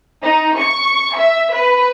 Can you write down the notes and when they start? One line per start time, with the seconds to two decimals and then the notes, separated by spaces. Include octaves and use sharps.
0.23 D#4
0.59 C#6
1.16 E5
1.54 B4